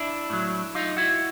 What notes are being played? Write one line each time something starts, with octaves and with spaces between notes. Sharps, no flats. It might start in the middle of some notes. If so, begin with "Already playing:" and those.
Already playing: D4 E4
A2 F#3
D#4 F4
E4 F#4